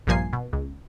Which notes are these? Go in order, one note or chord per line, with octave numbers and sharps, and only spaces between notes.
A#1 G2 F3 A#3 G#5 C7
B2
C#2